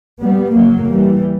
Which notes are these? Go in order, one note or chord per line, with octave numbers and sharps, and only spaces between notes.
G3 B3
F#1 E2 C#3 F#3 A#3
E3 G3